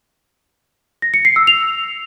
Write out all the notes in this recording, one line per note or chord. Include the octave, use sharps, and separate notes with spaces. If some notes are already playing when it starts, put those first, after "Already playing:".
A#6
C#7
C7
E6
F7